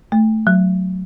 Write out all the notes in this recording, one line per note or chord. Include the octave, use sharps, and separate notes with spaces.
A3
F#3